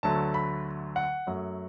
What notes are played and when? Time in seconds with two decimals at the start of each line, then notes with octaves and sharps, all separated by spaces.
0.03 D2 D3 F#3 A3 A5
0.34 B5
0.96 F#5
1.27 F#2 F#3 A3